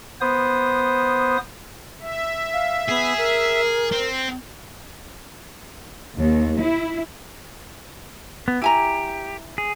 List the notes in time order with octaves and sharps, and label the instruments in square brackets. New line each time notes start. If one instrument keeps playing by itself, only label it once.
[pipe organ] B3 C5 D#6
E5
[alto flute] F5
[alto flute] B3 [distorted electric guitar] G#4
[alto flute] A#4
[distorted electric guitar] C4
[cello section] D#2
E4
[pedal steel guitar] B3
[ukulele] E4 G#5 A#5 [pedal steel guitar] G4
[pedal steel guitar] G#4